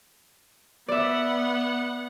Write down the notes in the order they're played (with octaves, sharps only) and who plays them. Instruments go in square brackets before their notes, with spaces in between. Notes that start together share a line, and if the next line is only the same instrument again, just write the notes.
[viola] B3 F#5 [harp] D5 E5